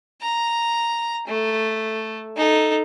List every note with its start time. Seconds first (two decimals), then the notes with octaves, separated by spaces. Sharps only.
0.22 A#5
1.27 A3
2.36 D#4 A4